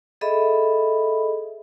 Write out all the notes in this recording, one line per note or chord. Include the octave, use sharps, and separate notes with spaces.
G#4 A4 D#5 E5 B5